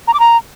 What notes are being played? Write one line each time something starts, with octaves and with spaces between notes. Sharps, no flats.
A#5
D6
A#5